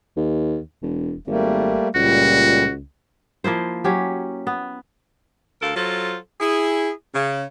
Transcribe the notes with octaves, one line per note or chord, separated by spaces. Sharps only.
D#2
E1
G#1 G3 A3 A#3
C#2 A#2 G3 F#4
F3 A#3 E4 C5
F#3 C#4 G4
B3
D2 A4 A#4 F5
F#3 F4 A4 C5
E4 G#4
C#3